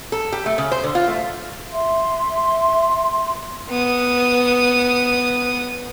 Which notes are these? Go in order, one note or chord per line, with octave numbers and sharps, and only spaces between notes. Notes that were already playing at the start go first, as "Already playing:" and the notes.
A4
G4
A3
C#3
C5
D3
F4
A3
E5 C6
B3 D#6